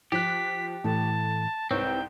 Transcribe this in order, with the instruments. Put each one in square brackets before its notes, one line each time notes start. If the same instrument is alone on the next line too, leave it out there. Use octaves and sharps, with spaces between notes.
[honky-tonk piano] F3 F#6 [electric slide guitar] G4 [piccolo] B6
[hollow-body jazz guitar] A2 E3 [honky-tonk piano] A3 [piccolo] A5
[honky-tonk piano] C2 G#2 [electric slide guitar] C4 [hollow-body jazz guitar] B4 C#5 [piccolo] G5